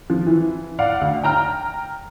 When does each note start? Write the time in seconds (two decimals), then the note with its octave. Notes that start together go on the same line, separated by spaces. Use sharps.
0.10 F3
0.27 E3
0.79 D5 F5 F#5
1.01 D2
1.23 G5 A#5 F6